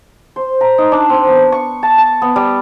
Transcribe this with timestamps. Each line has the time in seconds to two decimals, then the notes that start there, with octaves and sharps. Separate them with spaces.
0.36 C5
0.61 A#5
0.78 D#4
0.92 D4
1.09 C4
1.27 B3
1.52 C#6
1.83 A5
1.98 A5
2.22 B3
2.36 G3